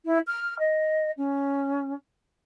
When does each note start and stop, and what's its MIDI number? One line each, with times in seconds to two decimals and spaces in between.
0.05 0.18 64
0.27 0.57 89
0.59 1.11 75
1.17 1.94 61